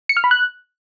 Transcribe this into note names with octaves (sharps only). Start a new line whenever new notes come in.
C#7
F6
B5
F#6